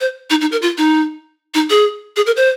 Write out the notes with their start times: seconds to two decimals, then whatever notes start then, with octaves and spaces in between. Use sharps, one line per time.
0.01 C5
0.30 D#4
0.41 D#4
0.52 A#4
0.62 F4
0.78 D#4
1.54 D#4
1.70 G#4
2.16 G#4
2.26 A#4
2.37 C5